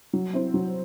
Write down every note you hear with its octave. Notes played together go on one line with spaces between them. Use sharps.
F#3
C4 E4
F#3